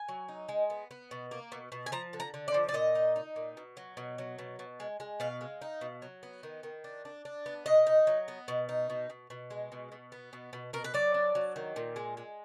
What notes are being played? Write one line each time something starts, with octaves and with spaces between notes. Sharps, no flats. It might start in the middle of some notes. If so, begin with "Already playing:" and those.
Already playing: G#5
F#3
D#4
G#3
B3
B3
B2
A#3
B2
B2
G#5
F3 A#5
D3
A#5
D3
D5
F3
D5
A#2 D#5
D#4
D#4
A#2
B2
F#3
B2
F#3
B2
B2
G#3
G#3
B2 F5
G#3
D#4
B2
F#3
B3
D#3
D#3
D4
D4
D4
B3
B2 D#5
D#4
F#3
B3
B2
D#4
B2
B2
B2
G#3
B2
B2
B3
B2
B2
B2 A#4
B4
F#3 D5
D4
F#3
D#3
A#2
G#3
G#3